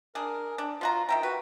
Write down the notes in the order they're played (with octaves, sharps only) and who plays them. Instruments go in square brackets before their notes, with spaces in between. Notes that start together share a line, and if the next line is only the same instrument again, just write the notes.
[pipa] D4 G#4 [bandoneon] A#4
[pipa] D4
[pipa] F3 F#4 A#5 [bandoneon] F4
[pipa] D#3 E5 A#5 [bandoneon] G5
[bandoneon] F#4 [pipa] B4